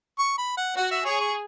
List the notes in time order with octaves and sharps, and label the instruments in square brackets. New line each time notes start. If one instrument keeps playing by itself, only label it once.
[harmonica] C#6
B5
F#5
[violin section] F#4 [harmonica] F#5
[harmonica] E5
[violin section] G#4 [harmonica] C#5
[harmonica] C#6